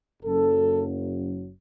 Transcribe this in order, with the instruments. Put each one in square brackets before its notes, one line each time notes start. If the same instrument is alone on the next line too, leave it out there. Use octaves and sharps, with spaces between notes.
[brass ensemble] F#1 F#2 F#3 A4